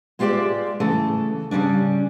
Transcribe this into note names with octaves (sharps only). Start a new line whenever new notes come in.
G#3 F4 G4 C#5 D5 E5
C#3 E3 A3 A4
C#3 G3 A3 C#4 D4